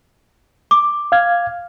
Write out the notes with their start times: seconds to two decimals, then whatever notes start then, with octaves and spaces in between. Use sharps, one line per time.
0.71 D6
1.12 F5 F6 G#6